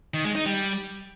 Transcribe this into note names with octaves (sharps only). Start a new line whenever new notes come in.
D#3
G#3
D#4
G3